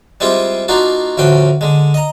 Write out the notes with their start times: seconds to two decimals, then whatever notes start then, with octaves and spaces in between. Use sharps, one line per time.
0.20 G3 G#3 C4 E4 F4 G4
0.68 A#3 D4 D#4 F4 F#4
1.17 A1 A2 D3 F3 F#4 G5
1.61 D3 G#3
1.94 D#5 A#5